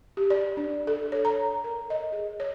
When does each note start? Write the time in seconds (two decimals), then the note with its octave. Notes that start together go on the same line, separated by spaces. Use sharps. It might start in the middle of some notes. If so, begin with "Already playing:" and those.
0.17 G4
0.30 D5
0.57 D4
0.87 A4
1.12 C#5
1.25 A#5
1.64 A#4
1.90 D#5
2.12 G#4
2.40 C#5